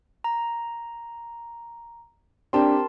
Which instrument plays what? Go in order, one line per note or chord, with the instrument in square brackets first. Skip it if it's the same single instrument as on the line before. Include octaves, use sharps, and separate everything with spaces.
[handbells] A#5
[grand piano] C4 G4 [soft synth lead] D4 [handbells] A#4 A5 C6